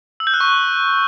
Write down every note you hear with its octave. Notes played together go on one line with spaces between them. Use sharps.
E6
G6
F#6
C#6